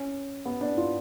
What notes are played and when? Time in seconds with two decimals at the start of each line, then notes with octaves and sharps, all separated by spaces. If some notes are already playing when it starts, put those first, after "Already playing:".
Already playing: C#4
0.45 B3
0.61 D4
0.77 F4